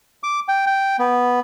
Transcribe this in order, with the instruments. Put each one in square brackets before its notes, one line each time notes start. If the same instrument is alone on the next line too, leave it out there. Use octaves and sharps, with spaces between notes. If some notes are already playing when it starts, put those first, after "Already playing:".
[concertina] D6
G5
G5
B3